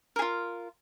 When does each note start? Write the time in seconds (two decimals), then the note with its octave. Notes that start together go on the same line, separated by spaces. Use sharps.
0.16 A#4
0.19 G#4
0.22 F4